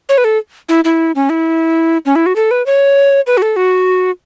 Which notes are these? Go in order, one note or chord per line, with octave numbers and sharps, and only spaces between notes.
C#5
B4
A4
E4
E4
C#4
E4
C#4
E4
F#4
A4
B4
C#5
B4
F#4
A4
F#4